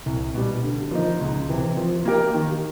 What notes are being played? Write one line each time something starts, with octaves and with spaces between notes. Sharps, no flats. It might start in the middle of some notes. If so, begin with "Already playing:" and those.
C2
B2 G3
D3
F3 A#3 D#4
C#2
C3 E3
F3
A#3 D#4 G4 A#4
D#3